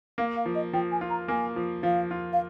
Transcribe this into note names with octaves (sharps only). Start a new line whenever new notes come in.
A#3 F5
F5
F3
D#5
F3 G5
G#5
F4
A#5
A#3 G#5
F3
F3 F5
F4
F5